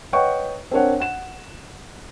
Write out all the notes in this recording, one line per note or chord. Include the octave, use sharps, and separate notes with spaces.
B4 C#5 D#5 F#5 G5 C#6
C4 D4 A#4 C#5 F#5
F#5 E7